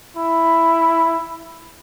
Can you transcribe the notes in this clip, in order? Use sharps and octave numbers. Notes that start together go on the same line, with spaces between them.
E4